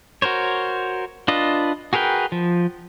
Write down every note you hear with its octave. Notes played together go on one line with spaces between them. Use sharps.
F#4 A#4 C5 C#5
D4 F4 B4 D#5
F#4 G#4 A#4 B4 G5
F3